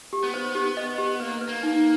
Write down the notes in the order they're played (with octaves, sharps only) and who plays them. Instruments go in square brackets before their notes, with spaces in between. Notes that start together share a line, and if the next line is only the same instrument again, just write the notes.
[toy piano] G4
[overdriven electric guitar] B3
[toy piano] C5
G4
D#5
G4
[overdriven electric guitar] A#3 [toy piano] B4
[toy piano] B4
[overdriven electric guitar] A#3
[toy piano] D#4